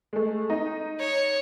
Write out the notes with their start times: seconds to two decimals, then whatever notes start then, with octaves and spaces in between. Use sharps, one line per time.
0.13 G#3 A3
0.50 D#4
0.99 C#5